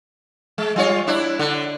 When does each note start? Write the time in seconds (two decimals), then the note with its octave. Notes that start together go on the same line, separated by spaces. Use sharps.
0.58 G#3
0.76 G3 F4 C#5
1.07 D4 E4
1.39 D3